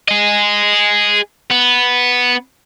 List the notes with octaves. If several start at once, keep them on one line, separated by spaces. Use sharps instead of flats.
G#4 D#5
B3